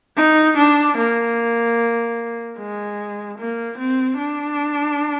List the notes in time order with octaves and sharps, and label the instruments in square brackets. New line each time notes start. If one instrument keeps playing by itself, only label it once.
[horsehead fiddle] D#4
D4
A#3
G#3
A#3
C4
D4